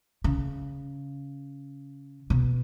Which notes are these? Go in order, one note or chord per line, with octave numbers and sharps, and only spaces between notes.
C#3
B2